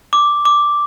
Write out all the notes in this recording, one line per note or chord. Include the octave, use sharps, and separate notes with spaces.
D6
D6